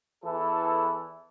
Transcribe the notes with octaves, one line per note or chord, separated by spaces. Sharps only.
E2 E3 A4